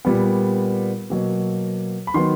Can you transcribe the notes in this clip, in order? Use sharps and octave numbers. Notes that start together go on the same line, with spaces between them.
A#2 G3 B3
B2 F#3 A#3
B5
D#3 F#3 B3 C6